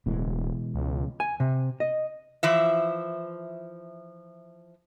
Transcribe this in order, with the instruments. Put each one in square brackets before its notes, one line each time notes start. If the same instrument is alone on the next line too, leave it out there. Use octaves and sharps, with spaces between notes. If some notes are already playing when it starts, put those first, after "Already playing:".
[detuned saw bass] D1 [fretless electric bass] B2 E3 G#3
[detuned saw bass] C#2
[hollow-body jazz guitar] G#5
C3
D#5
[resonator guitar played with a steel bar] E3 F3 E5